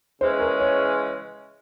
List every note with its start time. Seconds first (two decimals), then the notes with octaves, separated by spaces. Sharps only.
0.21 C#3 E3 G#3 C#4 C5
0.41 A#4
0.60 C#5